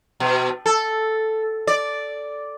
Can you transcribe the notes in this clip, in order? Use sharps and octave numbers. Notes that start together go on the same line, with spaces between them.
B2
A4
D5